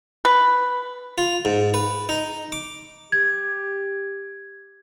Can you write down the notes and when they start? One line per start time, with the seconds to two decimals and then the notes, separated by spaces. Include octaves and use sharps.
0.25 B4
1.18 F4
1.45 G#2
1.74 B4
2.09 D#4
2.52 D6
3.12 G4 G#6